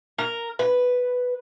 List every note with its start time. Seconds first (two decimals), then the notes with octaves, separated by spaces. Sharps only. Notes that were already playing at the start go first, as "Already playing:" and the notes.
0.18 A#4
0.59 B4